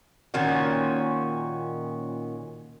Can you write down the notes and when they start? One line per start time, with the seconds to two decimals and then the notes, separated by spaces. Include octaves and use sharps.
0.34 A#2 D#3 C#4 F#4